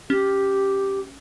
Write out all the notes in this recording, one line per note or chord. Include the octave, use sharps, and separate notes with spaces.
C#4 G4